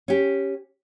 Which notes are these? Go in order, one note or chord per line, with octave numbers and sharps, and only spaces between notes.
C#4 G4